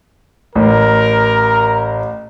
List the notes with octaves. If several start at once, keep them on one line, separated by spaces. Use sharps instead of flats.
A1 A#4